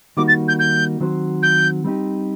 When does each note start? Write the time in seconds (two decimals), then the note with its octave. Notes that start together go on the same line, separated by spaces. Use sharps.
0.17 D#3 G3 A#3 D#4 F#4 D6
0.28 A6
0.48 G6
0.59 G6
1.00 D#3 F#3 C4 F#4 C5
1.42 G6
1.84 G3 C4 D#4 G4